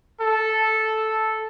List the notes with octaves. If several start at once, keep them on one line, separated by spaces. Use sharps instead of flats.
A4